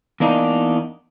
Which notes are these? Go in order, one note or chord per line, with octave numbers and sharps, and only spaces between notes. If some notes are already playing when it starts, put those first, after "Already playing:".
E2 A#3 D4 D#4